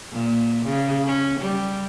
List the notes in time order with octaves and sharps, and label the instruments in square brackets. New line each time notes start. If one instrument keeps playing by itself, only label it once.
[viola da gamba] A#2
C#3
C#4
G3